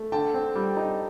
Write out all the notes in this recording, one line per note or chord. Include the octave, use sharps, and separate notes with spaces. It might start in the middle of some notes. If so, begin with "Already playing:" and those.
Already playing: A3
D3 G5 A5
C4
G3
D#4